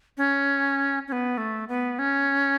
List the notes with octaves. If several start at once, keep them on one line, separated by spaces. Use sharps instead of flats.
C#4
C#4
B3
A3
B3
C#4